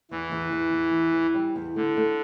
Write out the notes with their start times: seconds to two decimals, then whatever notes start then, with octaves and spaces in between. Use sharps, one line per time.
0.11 E2 E3
0.32 E2
0.52 E2
0.73 E2
0.94 E2
1.14 E2
1.34 G3
1.56 E2
1.76 D3 A3
1.97 A3